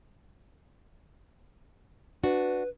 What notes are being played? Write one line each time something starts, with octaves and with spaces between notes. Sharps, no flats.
D4 F#4 B4